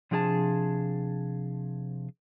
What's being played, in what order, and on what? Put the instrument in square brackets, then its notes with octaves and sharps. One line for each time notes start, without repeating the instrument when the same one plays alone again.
[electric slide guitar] C3 F3 D4 G#4 D5 A5